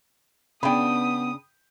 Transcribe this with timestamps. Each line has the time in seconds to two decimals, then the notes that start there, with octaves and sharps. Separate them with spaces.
0.63 C#3 B3 D4 G5 B5 D#6